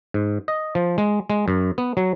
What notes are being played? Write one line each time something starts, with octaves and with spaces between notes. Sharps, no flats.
G#2
D#5
F3
G#3
G#3
F#2
B3
F#3